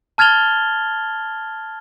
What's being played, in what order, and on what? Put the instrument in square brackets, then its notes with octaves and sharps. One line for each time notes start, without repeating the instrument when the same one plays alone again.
[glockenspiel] A5 F6 G#6 A6 F7 G7